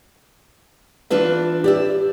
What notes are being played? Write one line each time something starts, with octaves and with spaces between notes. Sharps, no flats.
E3 D4 F4 B4 E5
G4 D5 E5